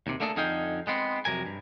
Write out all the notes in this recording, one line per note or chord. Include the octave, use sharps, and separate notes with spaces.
D#2 C3
A3 A#3 D4 G#4 A4
F2 D3 D#4 G#4 F5 G5
G#3 B3 C4
F2 C3 F#3 A#4 G#5
G2